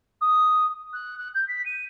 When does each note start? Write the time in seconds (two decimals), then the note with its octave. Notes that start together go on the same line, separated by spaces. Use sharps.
0.21 D#6
0.93 F#6
1.18 F#6
1.35 G6
1.48 B6
1.66 D#7